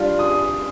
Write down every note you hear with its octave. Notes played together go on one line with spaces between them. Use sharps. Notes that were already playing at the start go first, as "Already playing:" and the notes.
Already playing: G3 D4 F4 F5
D#6